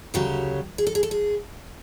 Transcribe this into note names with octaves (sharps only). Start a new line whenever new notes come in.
D2 C#3 F#3 G4
G#4
A4
G#4
A4
G#4